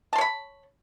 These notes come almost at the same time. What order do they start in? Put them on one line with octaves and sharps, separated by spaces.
A5 C6 C#5 B5